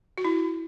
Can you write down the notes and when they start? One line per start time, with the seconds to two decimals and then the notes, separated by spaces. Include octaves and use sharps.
0.18 F#4
0.25 E4